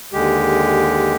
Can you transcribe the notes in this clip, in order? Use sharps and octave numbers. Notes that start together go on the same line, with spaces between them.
D#2 D3 G#3 G4